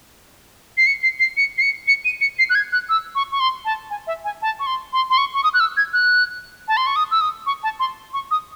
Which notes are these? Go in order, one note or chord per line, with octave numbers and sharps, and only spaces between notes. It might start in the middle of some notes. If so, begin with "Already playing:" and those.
C7
C#7
C7
C7
C#7
C7
C#7
C#7
D#7
C#7
C7
F#6
G#6
F#6
E6
C#6
C#6
C6
A5
G#5
E5
G#5
A5
C#6
C6
C6
C6
C#6
C#6
D#6
F#6
E6
G#6
F#6
A5
C6
C#6
D#6
E6
D#6
C#6
A5
C6
C#6
D#6